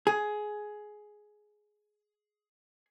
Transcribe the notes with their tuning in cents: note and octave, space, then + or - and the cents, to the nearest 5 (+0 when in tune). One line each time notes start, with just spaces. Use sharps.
G#4 +15